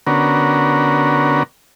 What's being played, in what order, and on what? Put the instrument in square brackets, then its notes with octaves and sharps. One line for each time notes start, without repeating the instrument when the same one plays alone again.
[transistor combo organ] D3 B3 C#4 F#4 A#4